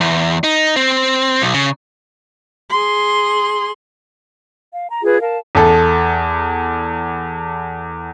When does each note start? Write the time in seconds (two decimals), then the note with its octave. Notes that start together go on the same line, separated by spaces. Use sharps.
0.01 E2
0.44 D#4
0.76 C4
1.42 B1
1.54 C#3
2.70 G#4 C6
4.73 F5
4.90 A#5
5.03 F4 G#4 B4
5.20 A#4 F5 A5
5.55 E2 A4